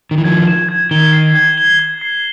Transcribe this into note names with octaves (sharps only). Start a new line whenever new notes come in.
D#3
E3
D#3 F3 G#6
E7
G#6
D#3 G7
C7
G#6
G7
G#6
C7